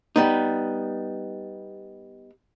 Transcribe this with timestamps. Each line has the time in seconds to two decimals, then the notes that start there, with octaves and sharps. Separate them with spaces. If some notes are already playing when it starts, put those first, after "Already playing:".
0.16 G3 B3 D#4